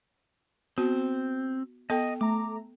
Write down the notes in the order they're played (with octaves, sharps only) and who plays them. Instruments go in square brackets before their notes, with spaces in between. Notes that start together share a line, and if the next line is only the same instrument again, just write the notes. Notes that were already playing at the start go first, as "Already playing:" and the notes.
[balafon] B3 F#4 [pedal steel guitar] C4
[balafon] B3 A4 G5 [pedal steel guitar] D#5
[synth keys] A3 A#5 [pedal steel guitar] D6